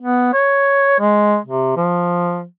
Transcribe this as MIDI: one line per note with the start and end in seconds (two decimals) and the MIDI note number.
0.01 0.32 59
0.33 0.99 73
0.99 1.37 56
1.45 1.75 48
1.76 2.44 53